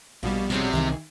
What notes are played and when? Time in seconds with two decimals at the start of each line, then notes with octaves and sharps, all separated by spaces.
0.23 A#1 B2 G3 A#3
0.50 C3 G#4 C#5 F#5
0.73 C2 D#3 E3 G#4